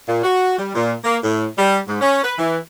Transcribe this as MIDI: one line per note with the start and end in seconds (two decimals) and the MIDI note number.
0.06 0.22 46
0.23 0.57 66
0.58 0.74 55
0.75 0.93 46
1.04 1.17 58
1.24 1.46 45
1.57 1.78 55
1.87 2.00 44
2.01 2.23 61
2.23 2.33 71
2.38 2.58 52